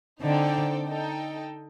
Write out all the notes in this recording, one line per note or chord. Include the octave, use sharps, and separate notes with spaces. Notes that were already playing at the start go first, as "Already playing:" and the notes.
D3 C4 D#4 A4 D5 G5
D#4 A4 D#5 G5